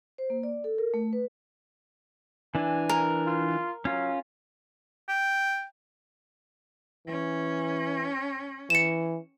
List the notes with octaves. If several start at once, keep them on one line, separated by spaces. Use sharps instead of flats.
C5
A#3
D5
A4
A#4
A3
B4
E3 D4 G#5
A#4
F4
F#3 C#4 F4
G5
E3 C#4
E3 C#7 E7